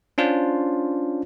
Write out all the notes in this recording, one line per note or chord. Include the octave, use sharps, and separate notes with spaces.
C#4 D4 F4 C5